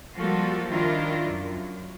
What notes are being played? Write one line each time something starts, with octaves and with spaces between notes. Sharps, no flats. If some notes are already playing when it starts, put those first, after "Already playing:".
F3 G3 A#3 F4 F#4 A4
D#3 D4 E4 F4 A#4
F#2